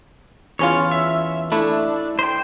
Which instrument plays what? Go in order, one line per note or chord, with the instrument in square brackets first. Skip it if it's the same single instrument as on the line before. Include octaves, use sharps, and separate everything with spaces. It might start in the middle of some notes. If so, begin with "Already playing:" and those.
[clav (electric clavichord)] E2 C#4 F4 [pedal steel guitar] C#5
[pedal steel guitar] E5
[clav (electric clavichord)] A3 E4 [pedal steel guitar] D4
[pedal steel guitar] C5 G5